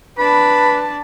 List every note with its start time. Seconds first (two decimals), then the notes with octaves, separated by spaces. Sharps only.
0.18 D4 B4 A5 B5